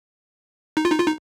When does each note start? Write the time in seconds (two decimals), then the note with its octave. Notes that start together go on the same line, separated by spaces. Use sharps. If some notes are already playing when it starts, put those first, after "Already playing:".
0.77 D#4
0.85 F4
0.91 D#4
1.00 F4
1.07 D#4